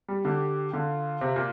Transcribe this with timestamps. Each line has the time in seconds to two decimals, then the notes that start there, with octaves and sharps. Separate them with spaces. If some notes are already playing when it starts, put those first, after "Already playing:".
0.08 G3
0.25 D3 G4
0.73 D3 F4
1.21 C3
1.36 A#2